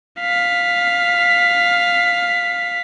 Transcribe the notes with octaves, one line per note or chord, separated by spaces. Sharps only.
F5 B6